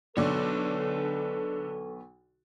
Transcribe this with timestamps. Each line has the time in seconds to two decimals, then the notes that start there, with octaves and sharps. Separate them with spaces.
0.17 B1 D3 A4 B4 C#5 D5